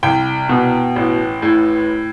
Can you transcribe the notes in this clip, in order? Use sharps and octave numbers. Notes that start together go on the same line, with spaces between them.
C2 G5
B2
A1
A2